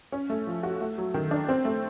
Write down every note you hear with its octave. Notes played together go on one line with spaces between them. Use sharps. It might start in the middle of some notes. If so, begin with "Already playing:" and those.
C#4
A3
F3
F#4
A3
F#3
D#3
D4
C4
A3